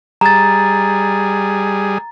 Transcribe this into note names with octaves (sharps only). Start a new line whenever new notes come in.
G3 G#4 A#5 A6